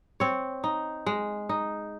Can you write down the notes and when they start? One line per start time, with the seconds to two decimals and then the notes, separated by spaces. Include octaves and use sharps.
0.20 C4 C#5
0.64 D#4
1.06 G#3
1.49 D#4